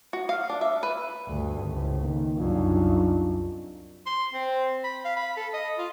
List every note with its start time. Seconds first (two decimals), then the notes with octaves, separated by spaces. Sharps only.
0.13 F#4
0.29 F5
0.50 D4
0.61 E5
0.83 B4
1.28 D2 G2
1.67 C#2 A2 C3
2.00 D#3 A#3
2.37 C2 F#2 D4 D#4 F4
4.07 C6
4.33 C4
4.84 B5
5.05 F5
5.17 B5
5.37 A4
5.53 D#5
5.78 F4